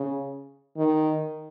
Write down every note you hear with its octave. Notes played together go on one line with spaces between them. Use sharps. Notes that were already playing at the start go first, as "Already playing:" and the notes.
Already playing: C#3
D#3